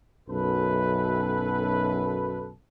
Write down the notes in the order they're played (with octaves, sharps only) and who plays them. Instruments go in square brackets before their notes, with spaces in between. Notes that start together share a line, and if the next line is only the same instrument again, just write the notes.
[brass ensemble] B1 F#2 A4 B4